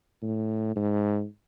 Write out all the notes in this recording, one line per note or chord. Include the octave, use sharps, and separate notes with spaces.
A2
G#2